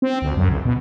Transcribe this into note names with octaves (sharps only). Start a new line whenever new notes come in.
C4
D2
F#2
C#2
B2